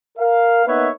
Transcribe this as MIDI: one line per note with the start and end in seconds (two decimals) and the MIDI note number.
0.18 0.64 70
0.18 0.64 77
0.66 0.89 58
0.66 0.89 59
0.66 0.89 63
0.66 0.89 71
0.66 0.89 73
0.66 0.89 76